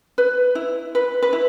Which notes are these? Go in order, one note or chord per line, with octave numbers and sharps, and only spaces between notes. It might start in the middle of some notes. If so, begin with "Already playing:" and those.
B4
E4
B4
B4
E4